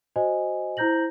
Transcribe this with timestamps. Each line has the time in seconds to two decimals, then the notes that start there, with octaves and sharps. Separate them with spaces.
0.16 F#4 C5 D#5 G#5
0.77 E4 C5 A#5 G6 A#6 F#7